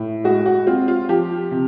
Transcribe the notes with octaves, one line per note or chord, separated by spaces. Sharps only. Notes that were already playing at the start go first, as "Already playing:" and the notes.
Already playing: A2
G#3 F#4
F#4
C4 F4
F4
F3 G4
C3